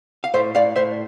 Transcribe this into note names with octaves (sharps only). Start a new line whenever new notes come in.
F5
A2 C5 E5
A2 D5 F5
A2 C5 E5